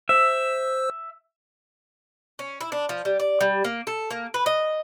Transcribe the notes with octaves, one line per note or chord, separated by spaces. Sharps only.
C5 E5 E6
C#4
E4
D4
F3
G3
D5
G3
A#3
A4
A#3
B4
D#5